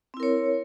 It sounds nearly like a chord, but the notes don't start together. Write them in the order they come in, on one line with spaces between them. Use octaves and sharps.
C4 E4 A#4 C#5